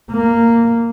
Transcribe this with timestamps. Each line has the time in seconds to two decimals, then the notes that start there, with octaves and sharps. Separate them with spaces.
0.11 A#3